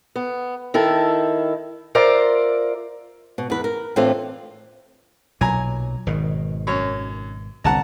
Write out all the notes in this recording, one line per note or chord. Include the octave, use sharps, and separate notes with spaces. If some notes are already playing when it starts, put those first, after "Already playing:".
B3
D#3 E4 A4
F4 A#4 C5 D5 E5
B2
E2 B4
A#4
A2 E3 C4 D4 F4 A4
B1 A#2 F#3 G#5 A#5
G#1 B2 D#3
F#2 C#5
G1 C2 F#5 A5 A#5